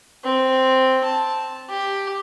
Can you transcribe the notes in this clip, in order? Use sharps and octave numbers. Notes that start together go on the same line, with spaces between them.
C4
A5
G4